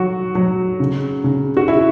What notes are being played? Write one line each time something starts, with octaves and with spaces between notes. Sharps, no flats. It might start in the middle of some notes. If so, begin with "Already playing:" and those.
Already playing: F#3 F#4
F#3
C#3
C#3
F#4
E4